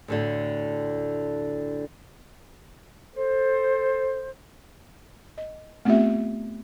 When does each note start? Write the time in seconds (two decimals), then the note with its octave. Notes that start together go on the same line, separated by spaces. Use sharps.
0.08 D2 A2 D3
3.14 A4 C5
5.38 D#5
5.85 A3 B3 C4 F4 G4 E5